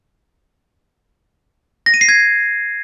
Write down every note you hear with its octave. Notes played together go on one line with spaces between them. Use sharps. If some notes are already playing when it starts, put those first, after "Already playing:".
A#6
D#7
C7
G#6